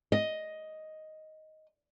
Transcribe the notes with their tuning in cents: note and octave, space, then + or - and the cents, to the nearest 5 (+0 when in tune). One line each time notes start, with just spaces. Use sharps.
D#5 +5